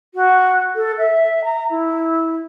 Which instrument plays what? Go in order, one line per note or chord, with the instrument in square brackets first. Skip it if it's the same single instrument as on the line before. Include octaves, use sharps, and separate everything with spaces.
[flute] F#4
A4
E5
A#5
E4